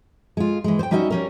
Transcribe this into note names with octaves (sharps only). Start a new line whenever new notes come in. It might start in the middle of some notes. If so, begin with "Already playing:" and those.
G#3 F4
E3 G#3
C5 G5
G3 C#4 D#4 F#4 D#5 E5
G3 C#4 A#4